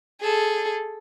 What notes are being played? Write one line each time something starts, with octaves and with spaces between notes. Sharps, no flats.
G#4 A4